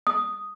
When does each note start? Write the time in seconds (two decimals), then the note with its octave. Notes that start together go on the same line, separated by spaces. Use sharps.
0.07 D#6